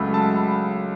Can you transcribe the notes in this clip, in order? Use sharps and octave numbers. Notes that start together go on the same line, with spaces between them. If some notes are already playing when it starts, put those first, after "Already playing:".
Already playing: C#2 C#3 F#3 A3 B5
A5
B5